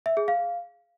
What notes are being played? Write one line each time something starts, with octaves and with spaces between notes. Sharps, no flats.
E5
G#4
F5